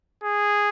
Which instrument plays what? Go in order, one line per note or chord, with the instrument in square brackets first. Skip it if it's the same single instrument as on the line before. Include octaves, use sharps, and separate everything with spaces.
[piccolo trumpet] G#4